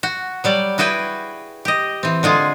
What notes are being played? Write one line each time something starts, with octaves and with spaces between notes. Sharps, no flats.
F#4
F#3 G3 D5
E4 F#4 G#4 B4 G5
G4 D#5
E3 C4
D3 G#3 F4 G#4